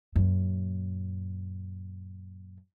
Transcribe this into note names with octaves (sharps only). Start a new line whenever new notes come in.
F#2 A#2